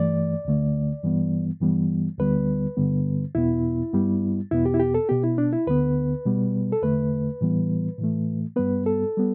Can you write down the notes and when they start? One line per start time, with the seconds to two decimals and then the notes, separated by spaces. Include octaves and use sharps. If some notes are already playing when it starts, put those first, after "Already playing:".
Already playing: G2 E3 A3 D5
0.45 D2 D3 A3
1.03 G2 E3 G3 B3
1.61 G2 E3 G3 B3
2.19 D2 D3 G3 B3 B4
2.77 G2 D3 G3 B3
3.35 E2 B2 B3 E4
3.93 G2 G3 B3
4.51 E2 B2 B3 E4
4.65 G4
4.74 E4
4.80 G4
4.94 A4
5.09 B2 B3 G4
5.23 E4
5.38 D4
5.53 E4
5.67 D2 D3 B3 B4
6.26 B2 G3 B3
6.72 A4
6.82 E2 D3 A3 B4
7.41 A2 E3 G3 B3
7.99 A2 E3 A3
8.56 G2 G3 B3 B4
8.86 A4
9.17 G3 B3